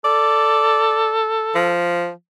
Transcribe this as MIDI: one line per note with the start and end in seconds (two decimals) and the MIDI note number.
0.05 1.76 69
0.05 1.13 74
1.55 2.10 53